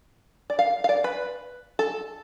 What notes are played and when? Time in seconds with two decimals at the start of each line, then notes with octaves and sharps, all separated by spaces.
0.50 D5
0.59 F5
0.84 F5
0.89 D5
1.04 B4
1.79 A4